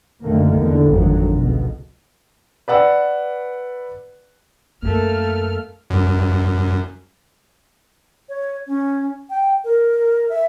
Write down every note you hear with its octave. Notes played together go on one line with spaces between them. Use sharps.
F#2 D3 D#3 A3 A#3
E2 D3
G#1 F2 D3 F#3
C#2 B2
B4 D5 F#5 E6
F#2 A3 A#3 F6
F#2
C#5
C#4
G5
A#4
E5